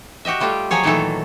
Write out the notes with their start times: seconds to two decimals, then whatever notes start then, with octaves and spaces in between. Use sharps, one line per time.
0.25 F#4 G4 D#5 E5
0.40 G3 A3 F4 G4
0.71 F3 F#3 G#4 C#5
0.84 A#2 D#3 E3 F#3 A3 A4